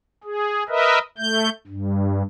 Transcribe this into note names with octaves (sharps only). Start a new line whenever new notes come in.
G#4
A#4 B4 D#5 E5
A3 G6
G2